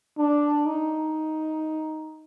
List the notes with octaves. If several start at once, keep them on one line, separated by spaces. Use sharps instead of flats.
D4
D#4